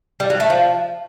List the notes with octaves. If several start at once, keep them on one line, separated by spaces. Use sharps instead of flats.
G3
F#3
A3
F3